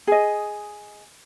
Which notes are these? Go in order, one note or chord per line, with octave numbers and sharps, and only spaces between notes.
G#4 D#5